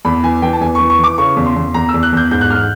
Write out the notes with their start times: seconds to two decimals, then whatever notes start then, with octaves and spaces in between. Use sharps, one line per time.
0.05 E2 B5
0.24 E3 G#5
0.42 E3 G5
0.53 A5
0.61 E2 G#5
0.75 C#6
0.80 E3
0.90 C#6
0.99 E3 D6
1.18 C#3 C#6
1.37 E2
1.46 C6
1.56 E2
1.74 E2 A#5
1.89 E6
1.94 E2
2.03 F#6
2.12 E2 G6
2.31 G#2 G6
2.41 F#6
2.50 G#2 F6